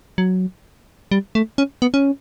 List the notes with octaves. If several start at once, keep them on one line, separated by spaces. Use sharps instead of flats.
F#3
G3
A3
C#4
B3
C#4